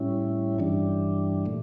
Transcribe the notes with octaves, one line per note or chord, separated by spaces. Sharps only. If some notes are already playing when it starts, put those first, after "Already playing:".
Already playing: A2 G3 C#4 E4
G2 E3 G3 D4
A#2 A3